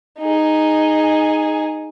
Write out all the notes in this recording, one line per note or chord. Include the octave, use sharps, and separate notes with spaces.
D#4 G#4